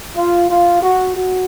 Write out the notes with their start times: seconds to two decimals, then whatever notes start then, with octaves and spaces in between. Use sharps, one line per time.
0.16 F4
0.49 F4
0.83 F#4
1.17 F#4